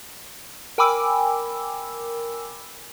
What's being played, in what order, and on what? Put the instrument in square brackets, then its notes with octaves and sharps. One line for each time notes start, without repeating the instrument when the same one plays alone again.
[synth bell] A#4 G5 G#5 B5 D6 E6